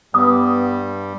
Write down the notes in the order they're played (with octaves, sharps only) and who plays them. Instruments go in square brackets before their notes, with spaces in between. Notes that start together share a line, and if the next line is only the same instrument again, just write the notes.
[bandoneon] G2 G3 [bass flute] B3 [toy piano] D6 D#6